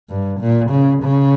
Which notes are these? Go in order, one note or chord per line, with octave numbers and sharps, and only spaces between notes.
G2
A#2
C#3
C#3